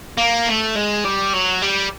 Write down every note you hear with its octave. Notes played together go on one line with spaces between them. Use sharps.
A#3
A3
G#3
G3
F#3
G3